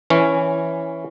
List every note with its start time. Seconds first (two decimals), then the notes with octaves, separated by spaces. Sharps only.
0.10 E3 C#4